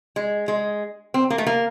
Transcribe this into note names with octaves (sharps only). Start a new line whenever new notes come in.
G#3
G#3
C4
A#3
A3
A#3